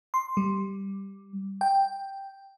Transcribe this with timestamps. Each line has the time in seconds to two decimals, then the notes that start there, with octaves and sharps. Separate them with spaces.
0.14 C6
0.37 G3
1.61 G5